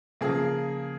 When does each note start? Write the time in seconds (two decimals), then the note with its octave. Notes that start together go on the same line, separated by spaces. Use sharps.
0.21 C#3 F3 A#3 G#4